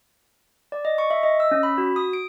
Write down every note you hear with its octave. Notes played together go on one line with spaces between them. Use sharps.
D5
D#5
C#6
E5
D#5
E6
C#4
B5
F#4
D#6
D7